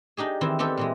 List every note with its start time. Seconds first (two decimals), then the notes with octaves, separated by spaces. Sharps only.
0.17 D4 D#4 G4 G#4
0.41 D#3 E3 C4 E4
0.59 B3 C4 D4 G4 A4 B4
0.77 A#2 E3 G#3